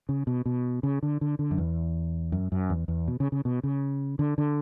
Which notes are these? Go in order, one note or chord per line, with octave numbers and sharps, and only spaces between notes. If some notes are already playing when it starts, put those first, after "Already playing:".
C#3
B2
B2
C#3
D3
D3
D3
F#2
E2
F#2
F#2
E2
E2
B2
C#3
C#3
B2
C#3
D3
D3